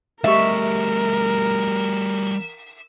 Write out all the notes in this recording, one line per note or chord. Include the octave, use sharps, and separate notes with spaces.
G3 A3 G4 A#4 D#5 E5